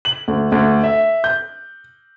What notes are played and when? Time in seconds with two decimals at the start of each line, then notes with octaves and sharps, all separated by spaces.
0.05 F#7
0.28 D2
0.52 D2
0.84 E5
1.24 G6